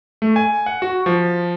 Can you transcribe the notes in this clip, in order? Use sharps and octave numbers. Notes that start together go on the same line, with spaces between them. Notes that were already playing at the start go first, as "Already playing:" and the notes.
A3
G#5
F#5
F#4
F3